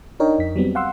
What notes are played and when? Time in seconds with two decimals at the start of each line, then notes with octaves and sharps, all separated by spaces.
0.20 D4 D#4 A#4 C#5 D#5 G5
0.39 F2 B6
0.56 F#3 G3 B3 C4
0.75 F5 F#5 C6 E6